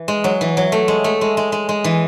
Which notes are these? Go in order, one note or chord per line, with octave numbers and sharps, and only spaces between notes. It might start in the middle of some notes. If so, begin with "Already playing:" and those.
Already playing: E3
G#3
F#3
E3
F#3
A3
G#3
A3
G#3
G#3
G#3
G#3
E3